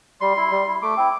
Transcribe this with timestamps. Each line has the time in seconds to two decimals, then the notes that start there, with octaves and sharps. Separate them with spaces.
0.21 G3 C6
0.37 E4
0.51 G3
0.67 E4
0.82 A3 D6
0.97 C4 E4